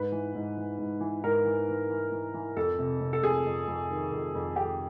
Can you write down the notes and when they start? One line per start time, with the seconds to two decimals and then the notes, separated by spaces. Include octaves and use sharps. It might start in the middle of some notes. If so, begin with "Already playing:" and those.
Already playing: G#2 B4
0.12 E3
0.35 G#2
0.57 E3
0.79 G#2
1.01 E3
1.23 G#2 A#4
1.45 E3
1.68 E3
1.90 E3
2.12 E3
2.34 E3
2.57 F2 A4
2.79 C3
3.01 C3
3.13 A4
3.23 F2 G#4
3.46 F2
3.68 F2
3.90 D#3
4.12 F2
4.35 F2
4.56 F2 G4